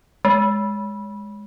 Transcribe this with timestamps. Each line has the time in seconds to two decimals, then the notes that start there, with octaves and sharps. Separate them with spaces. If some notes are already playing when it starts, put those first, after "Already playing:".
0.25 G#3